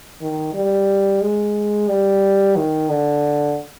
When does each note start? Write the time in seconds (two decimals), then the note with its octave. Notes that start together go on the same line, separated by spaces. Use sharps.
0.21 D#3
0.54 G3
1.21 G#3
1.88 G3
2.56 D#3
2.89 D3